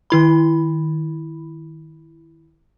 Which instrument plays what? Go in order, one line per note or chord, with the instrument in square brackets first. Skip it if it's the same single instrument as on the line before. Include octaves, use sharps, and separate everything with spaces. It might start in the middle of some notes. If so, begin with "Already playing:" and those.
[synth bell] D#3 E4 B5